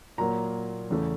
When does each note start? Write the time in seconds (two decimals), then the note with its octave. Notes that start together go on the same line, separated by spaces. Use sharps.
0.18 A#2 F#3 A#3 A#5
0.90 E2 C#3 E3 A3